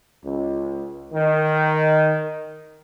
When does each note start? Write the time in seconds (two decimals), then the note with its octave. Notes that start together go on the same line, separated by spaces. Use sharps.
0.24 C#2
1.13 D#3